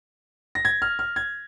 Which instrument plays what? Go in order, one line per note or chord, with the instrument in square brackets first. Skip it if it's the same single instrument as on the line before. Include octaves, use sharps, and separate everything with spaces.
[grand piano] A#6
G#6
F6
F6
G#6